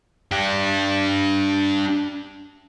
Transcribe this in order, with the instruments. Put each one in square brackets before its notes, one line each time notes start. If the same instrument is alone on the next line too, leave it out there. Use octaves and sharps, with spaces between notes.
[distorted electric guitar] D4 G4